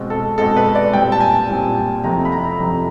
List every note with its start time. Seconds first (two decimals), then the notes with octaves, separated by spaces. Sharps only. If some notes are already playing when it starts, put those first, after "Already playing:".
Already playing: B2 G#3 C4
0.10 A4
0.38 B2 G#3 C4 A4
0.57 B4
0.75 D5
0.93 A#2 G3 C4 G5
1.12 A5
1.20 G#5
1.49 A#2 G3 C4
2.04 F2 C3 F3 A3 C4 A#5
2.25 B5
2.32 A#5
2.59 F2 C3 F3 A3 C4